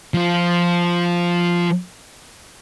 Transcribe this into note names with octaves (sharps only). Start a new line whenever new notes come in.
F3 F4